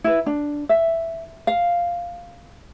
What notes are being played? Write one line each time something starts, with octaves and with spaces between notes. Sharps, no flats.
E4 B4
D4
E5
F5